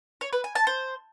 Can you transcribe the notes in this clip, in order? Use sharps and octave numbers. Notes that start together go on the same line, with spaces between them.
C#5
B4
G#5
A5
C5